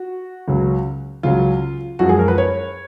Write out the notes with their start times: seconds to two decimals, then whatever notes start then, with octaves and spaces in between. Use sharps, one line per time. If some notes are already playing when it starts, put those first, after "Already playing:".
Already playing: F#4
0.48 C#2 C#3 F#3
1.23 C#2 C#3 F#3 F4
1.99 F#2 F3 G#3 F#4
2.09 G#4
2.19 A#4
2.28 B4
2.38 C#5